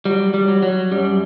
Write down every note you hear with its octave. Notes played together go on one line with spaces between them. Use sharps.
F#3 G3
G3
F#3
F#3
F#2 G3